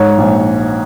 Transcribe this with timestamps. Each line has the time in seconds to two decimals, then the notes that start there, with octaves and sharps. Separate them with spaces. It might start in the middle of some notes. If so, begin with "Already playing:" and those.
Already playing: G#2 C#5
0.18 A#1